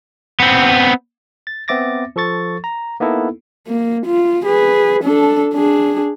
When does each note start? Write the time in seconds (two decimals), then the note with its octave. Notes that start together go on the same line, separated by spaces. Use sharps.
0.40 B3 C4
1.47 A6
1.68 B3 C4 E5 D6 A6 A#6
2.16 F3 A4 C#6 A6
2.64 A#5
3.00 A#3 B3 D#4 E4 A4
3.67 A#3
4.06 F4
4.45 G#4 B4
5.04 D4 A4
5.54 D4 G#4